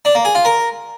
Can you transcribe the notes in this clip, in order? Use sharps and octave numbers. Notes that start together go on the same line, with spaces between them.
D4
A#3
G#4
F4
A#4